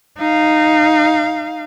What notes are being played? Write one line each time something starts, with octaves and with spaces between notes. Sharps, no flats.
D#4 F5